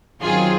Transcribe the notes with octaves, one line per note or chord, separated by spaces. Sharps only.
F#2 D#3 F#3 C4 F4 G#4